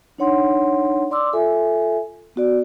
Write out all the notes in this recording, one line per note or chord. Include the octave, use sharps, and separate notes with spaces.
D4 D#4 C#5 F#5 C6
D5 C6 D6 E6
F4 A4 E5 G#5
B3 F#4 D5